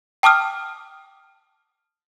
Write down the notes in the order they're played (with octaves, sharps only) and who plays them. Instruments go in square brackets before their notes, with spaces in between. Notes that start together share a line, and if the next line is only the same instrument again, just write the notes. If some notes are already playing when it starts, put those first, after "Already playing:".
[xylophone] G5 A5 D6 D#6 F6